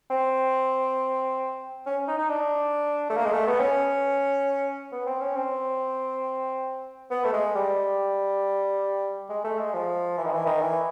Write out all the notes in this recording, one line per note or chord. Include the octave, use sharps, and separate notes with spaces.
C4
C#4
D#4
D#4
D4
A3
A#3
G#3
A3
B3
C#4
B3
C4
C#4
C4
B3
A3
G#3
G3
G#3
A3
G#3
F3
E3
D#3
E3
D#3
E3